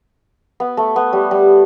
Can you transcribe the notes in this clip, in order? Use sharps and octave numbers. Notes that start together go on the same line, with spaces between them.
B3
A3
B3
G3
G3